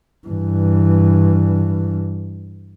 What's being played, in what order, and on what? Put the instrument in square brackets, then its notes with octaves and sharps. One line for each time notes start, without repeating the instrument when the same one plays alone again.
[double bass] G2 E3